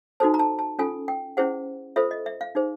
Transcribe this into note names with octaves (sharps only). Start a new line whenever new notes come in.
D#4 F#4 A4 C5 A5
A#5
A5
A5
C#4 F4 A4 G#5
G5
C#4 E4 G#4 C5 F#5
F4 A4 C5 E5
D#5
E5
F5
D#4 G#4 C5